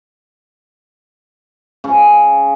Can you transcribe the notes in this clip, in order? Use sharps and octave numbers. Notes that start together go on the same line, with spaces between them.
C#3